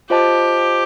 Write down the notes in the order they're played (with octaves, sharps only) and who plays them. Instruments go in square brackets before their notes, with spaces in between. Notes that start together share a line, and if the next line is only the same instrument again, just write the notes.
[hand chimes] F4 C5 D#5 A5 [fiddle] G4